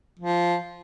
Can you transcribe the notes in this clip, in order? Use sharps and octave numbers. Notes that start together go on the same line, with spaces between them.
F3